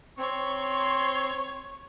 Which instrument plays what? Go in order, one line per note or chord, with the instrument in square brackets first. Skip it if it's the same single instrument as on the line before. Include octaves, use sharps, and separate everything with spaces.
[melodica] C4 [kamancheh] C#5 C#6 [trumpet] C6